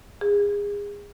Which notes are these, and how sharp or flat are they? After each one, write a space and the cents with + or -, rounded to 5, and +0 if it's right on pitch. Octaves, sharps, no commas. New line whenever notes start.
G#4 -30